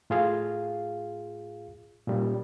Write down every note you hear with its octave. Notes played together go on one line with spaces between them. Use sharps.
A2 F4 G#4 F5
A#2 G3 C#4